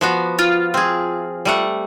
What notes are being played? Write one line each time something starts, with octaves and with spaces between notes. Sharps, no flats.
F3 B3 F#4
F4
C4 G#4
G3 A3 F#5